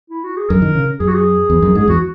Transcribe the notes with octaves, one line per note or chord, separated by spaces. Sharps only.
E4
F#4
G#4
F#2 A#4
D#3
C#3
F#2 G#4
F#4
G#4
E2
F#2
G#2 G#4
E2 F#4